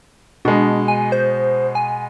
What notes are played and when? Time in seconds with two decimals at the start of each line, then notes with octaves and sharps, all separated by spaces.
0.45 B2 G#3 D4
0.88 G#5
1.12 C5
1.75 G#5